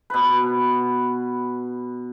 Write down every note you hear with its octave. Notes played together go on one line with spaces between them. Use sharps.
B2 B4